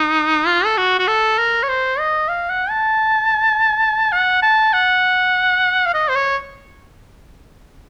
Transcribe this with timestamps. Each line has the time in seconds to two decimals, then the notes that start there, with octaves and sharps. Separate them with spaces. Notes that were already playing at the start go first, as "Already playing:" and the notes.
Already playing: D#4
0.47 F4
0.65 A4
0.77 F#4
0.99 F#4
1.08 A4
1.38 A#4
1.63 C#5
1.69 C5
1.99 D#5
2.29 F5
2.50 F#5
2.70 A5
4.12 F#5
4.42 A5
4.73 F#5
5.86 F5
5.94 D#5
6.09 C5
6.15 C#5